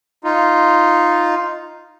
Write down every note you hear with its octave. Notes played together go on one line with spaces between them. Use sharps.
D#4 F4